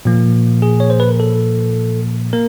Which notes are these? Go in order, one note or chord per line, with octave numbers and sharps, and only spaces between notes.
A#2 F3 A#3
G#4
C#5
C5
B4
A#4
A4
A#3 A#4